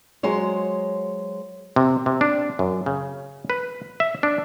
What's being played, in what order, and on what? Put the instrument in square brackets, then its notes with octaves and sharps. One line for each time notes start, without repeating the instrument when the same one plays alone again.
[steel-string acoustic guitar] F#3 G#3 C5 C#5
[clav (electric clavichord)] C3
C3
D4
F#2
C#3
B4
E5
D4